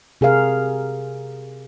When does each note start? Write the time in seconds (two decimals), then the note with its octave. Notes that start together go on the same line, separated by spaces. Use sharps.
0.21 C3 G#4 A#4 F5